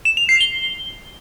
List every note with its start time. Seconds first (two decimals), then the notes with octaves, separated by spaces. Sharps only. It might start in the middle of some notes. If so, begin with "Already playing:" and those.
0.05 E7
0.17 F7
0.29 C7
0.41 G7